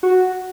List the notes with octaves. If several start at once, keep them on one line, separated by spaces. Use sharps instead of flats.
F#4